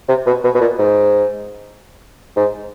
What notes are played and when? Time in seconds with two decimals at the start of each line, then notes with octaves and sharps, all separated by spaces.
0.09 C3
0.27 B2
0.44 B2
0.55 B2
0.61 A#2
0.79 G#2
2.37 G#2